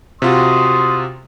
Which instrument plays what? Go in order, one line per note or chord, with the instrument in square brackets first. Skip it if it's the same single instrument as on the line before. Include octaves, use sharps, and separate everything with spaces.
[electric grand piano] C3 F4 F#4 [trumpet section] C6 D#6